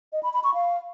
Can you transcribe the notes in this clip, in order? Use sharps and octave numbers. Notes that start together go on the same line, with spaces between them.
D#5
B5
B5
C#6
F5